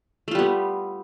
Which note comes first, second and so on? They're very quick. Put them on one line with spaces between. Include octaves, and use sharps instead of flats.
A3 F4 G3 B3